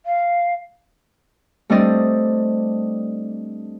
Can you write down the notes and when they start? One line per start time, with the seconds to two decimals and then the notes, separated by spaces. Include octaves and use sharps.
0.06 F5
1.70 G3 A3 C4 D4 D5 D#5